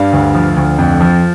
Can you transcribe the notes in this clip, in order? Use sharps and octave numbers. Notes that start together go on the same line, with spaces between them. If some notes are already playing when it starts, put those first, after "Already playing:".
Already playing: G2 D5 F5
D2
F3
D2
F2
F3